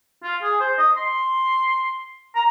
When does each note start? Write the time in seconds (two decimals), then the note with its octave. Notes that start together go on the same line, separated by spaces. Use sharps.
0.23 F4
0.42 G#4
0.60 C5
0.78 D#5
0.97 C6
2.36 A#5